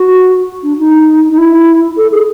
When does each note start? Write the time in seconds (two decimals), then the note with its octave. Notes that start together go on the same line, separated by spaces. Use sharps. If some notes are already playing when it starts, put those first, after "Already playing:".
Already playing: F#4
0.63 D4
0.78 D#4
1.30 D#4
1.38 E4
1.97 A4
2.12 G#4